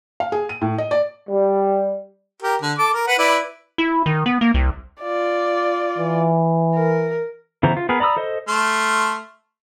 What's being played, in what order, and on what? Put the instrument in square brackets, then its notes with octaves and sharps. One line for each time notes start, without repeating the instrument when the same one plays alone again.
[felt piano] F5
G#4
D#7
A2
D#5
D5
[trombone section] G3
[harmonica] G4 A#4
D3
A4 D6
A#4
B4 F#5
E4 B4 D5
[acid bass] E4
D#3
B3
A#3
C2
[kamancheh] F4 D5
[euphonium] E3
[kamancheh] A#4
[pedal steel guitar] C#3 E3 B3 C5 A#5
F4
B3 G#4 A#4 B4
D5 A#5 B5 D#6 E6
A4 C5 D#5
[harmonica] A3 C6 F6